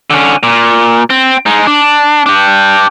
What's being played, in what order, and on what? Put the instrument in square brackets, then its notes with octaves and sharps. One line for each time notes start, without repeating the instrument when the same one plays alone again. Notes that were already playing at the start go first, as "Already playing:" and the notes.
[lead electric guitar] D3 C#4
A#2
C4
G#3 D#4
D4
D4 G4